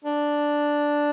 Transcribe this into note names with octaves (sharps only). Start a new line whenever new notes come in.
D4